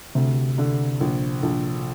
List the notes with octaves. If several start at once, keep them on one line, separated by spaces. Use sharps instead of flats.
D2 C3
D3
A#1
A#1